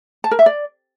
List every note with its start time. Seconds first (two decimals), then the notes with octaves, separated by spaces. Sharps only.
0.24 A5
0.31 A#4
0.39 E5
0.46 D5